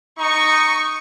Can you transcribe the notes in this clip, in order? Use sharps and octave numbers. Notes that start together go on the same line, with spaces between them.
D#4 C#6 C#7